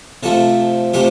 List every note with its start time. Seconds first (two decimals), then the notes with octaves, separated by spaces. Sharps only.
0.23 C3 F3 A3 A4
0.93 C3 F3 A3 G4